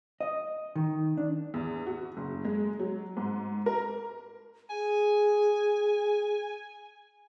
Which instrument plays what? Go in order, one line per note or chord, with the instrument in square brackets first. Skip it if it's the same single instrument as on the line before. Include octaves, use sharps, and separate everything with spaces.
[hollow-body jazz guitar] D#5
D#3
D4
[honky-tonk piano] E2
F#4
F#1
G#3
F#3
G#2
A#4
[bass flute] G#4 [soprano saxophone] G#5